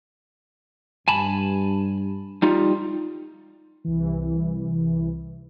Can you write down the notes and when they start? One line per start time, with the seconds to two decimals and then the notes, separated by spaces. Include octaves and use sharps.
1.08 G2 G#5 A5 B5
2.42 G3 D#4 F4
3.84 C2 E3